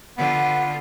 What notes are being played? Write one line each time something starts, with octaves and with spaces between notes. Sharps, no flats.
D3 B3 F4